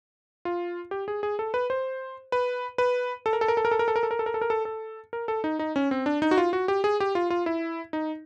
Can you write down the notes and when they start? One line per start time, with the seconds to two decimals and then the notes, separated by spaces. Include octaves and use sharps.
0.45 F4
0.91 G4
1.08 G#4
1.23 G#4
1.39 A4
1.54 B4
1.70 C5
2.32 B4
2.78 B4
3.26 A4
3.33 A#4
3.41 A4
3.48 A#4
3.57 A4
3.65 A#4
3.71 A4
3.79 A#4
3.88 A4
3.96 A#4
4.03 A4
4.11 A#4
4.19 A4
4.26 A#4
4.34 A4
4.41 A#4
4.50 A4
4.65 A4
5.13 A#4
5.28 A4
5.44 D#4
5.59 D#4
5.76 C#4
5.91 C4
6.06 D4
6.22 D#4
6.31 F#4
6.38 F4
6.53 F#4
6.68 G4
6.84 G#4
7.00 G4
7.15 F4
7.30 F4
7.46 E4
7.93 D#4